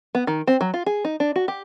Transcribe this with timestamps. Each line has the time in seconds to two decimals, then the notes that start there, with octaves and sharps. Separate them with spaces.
0.15 B3
0.27 D#3
0.47 C4
0.61 F#3
0.74 F4
0.86 G#4
1.05 D#4
1.20 D4
1.36 F#4
1.48 G4